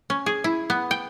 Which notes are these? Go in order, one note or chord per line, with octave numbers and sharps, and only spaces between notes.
C#4
G#4
E4
B3
G5